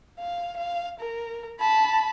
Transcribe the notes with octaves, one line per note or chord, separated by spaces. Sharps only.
F5
F5
A#4
A5 B5